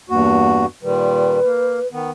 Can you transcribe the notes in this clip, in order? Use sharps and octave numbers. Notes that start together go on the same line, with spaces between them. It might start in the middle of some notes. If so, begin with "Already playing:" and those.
E2 G2 A#3 F#4
A#2 D#3 G3 B4
A#3
D#3 B3